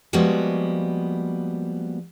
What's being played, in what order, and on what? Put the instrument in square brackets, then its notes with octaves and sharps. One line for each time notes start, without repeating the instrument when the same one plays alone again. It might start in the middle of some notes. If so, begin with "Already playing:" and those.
[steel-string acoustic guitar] F3 G3 G#3 A#3 B3 F#4